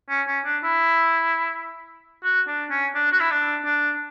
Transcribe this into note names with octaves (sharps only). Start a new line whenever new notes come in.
C#4
C#4
D4
E4
F#4
D4
C#4
D4
F#4
E4
D4
D4